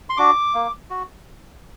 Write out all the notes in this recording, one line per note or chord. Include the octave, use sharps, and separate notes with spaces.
C6
D4 F#4 D6
A#3
F#4